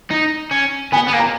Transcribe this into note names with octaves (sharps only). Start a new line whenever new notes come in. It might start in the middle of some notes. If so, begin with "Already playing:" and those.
D#4
C#4
B3 G#5
B3
A#3
A#5